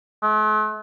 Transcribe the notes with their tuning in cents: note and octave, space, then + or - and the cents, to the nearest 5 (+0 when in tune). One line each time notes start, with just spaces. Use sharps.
A3 -45